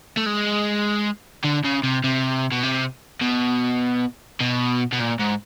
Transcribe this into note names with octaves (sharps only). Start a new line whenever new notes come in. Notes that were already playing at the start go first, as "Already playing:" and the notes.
A3
G#3
D3
C#3
C3
C3
B2
C3
B2
B2
B2
A#2
G#2